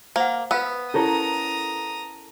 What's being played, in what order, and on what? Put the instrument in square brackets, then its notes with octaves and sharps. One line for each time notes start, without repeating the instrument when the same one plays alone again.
[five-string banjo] A#3 [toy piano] C5 F#5
[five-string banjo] B3 [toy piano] B4 F5 E6
[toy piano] C#4 E4 [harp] A4 A#4 C#5 [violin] A#5 D#6